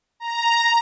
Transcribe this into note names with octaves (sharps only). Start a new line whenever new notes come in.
A#5